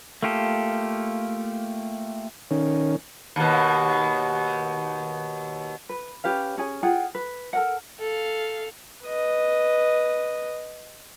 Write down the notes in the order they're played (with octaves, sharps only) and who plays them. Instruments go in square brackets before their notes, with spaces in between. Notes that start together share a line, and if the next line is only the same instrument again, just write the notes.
[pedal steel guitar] A3 A#3 F4 G4 A4
[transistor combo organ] D#3 C#4
[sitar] D#2 B2
[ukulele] B4
C#4 G4 B4 F5
C#4 G#4 G#5
F4 G#4 F#5 G5
B4
A4 A#4 F#5
[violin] A4 F5
[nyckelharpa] B4 D#5